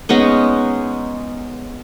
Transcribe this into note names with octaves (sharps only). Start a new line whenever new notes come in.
G#3 B3 C#4 D#4